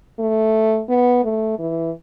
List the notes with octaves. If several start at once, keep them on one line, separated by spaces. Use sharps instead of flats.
A3
B3
A3
E3